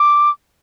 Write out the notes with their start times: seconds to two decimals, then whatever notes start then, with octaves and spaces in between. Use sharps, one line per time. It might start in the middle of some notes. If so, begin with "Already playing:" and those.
Already playing: D6